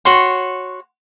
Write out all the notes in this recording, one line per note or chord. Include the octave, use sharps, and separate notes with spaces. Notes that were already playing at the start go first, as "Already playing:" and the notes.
F#4 C#5 C6